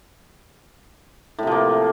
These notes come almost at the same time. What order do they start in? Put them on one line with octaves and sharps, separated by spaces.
A2 C3 F3 A#3